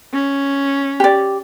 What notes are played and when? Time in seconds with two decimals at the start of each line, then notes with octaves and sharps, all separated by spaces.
0.13 C#4
1.00 G4 D5